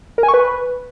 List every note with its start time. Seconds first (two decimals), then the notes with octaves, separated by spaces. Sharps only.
0.18 A#4
0.23 G#5
0.28 C#6
0.34 B4